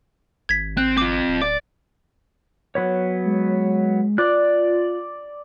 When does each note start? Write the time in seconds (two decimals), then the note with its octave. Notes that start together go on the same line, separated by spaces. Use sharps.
0.49 G#1 G#6 B6
0.77 C4 F#6
0.98 C4 F4 D6
1.28 D1
1.42 D5 D6
2.75 F#3 B3 C#5
3.25 G#3
4.18 F4 D5 F#6